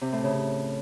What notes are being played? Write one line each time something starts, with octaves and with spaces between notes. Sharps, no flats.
C3
A2
C#3